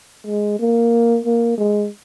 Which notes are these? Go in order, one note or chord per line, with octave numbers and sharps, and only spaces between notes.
G#3
A#3
A#3
G#3